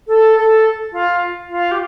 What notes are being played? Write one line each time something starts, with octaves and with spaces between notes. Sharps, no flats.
A4
A4
F4
F4
G4